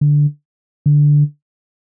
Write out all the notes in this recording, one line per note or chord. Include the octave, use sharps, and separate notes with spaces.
D3
D3